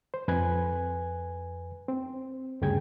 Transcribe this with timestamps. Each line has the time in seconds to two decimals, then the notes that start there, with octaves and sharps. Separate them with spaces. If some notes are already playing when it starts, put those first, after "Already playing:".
0.14 C5
0.28 F2 B4 G#5 F#6 G#6
1.88 C4
2.61 D2 G2 C#3 G#4 G5 G#6